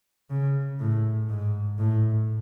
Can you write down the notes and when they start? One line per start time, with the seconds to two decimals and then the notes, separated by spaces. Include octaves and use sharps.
0.30 C#3
0.79 A2
1.29 G#2
1.79 A2